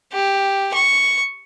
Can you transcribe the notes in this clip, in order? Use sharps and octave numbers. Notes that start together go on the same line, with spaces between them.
G4
C#6